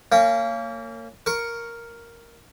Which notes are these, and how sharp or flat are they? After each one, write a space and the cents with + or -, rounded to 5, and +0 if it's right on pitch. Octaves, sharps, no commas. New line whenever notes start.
A#3 -30 C#4 +5
A#4 +0 C#6 +0